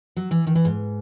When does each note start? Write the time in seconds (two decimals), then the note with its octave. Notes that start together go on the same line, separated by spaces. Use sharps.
0.16 F#3
0.31 E3
0.47 D#3
0.55 E3
0.65 G#2